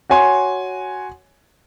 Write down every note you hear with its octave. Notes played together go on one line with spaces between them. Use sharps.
F#4 C#5 G#5 C6